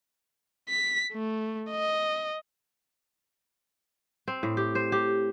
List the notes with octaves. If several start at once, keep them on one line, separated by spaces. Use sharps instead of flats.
B6
A3
D#5
C4
A2
G4
C5
G4